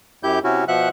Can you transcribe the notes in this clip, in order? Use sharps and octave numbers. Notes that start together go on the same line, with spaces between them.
F#2 E4 G4 G6
C3 C#4 E4 F#4
B2 F3 E5 F#5 F#6